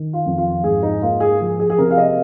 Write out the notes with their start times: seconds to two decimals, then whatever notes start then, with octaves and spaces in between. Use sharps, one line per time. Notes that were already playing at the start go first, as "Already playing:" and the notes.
Already playing: D#3
0.13 F4
0.26 F2
0.38 F4
0.63 G#2 G#4
0.83 D#4
1.02 A#3 F4
1.20 G#4
1.41 F3
1.59 G#4
1.70 G#4
1.78 C3 A#4
1.91 F5
1.98 D#5